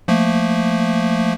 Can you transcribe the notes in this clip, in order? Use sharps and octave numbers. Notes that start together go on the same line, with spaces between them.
F3 A3 A#3